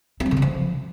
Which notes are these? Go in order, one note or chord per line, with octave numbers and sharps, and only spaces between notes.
C4
F#3
D3
C#3
F3